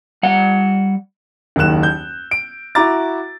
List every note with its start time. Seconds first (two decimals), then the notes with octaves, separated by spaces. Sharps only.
0.23 G3 F#5
1.56 F#1 D#2 D#3 F#6 E7
1.83 G6
2.31 D7
2.75 E4 F#4 A#5 D6 A6